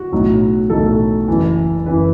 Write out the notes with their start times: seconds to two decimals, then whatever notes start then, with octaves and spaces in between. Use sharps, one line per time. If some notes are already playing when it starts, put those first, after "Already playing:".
Already playing: F#4
0.12 B1 A2 F#3
0.70 B1 A2 F#3 A4
1.28 F#1 F#2 E3
1.86 F#1 F#2 E3 B4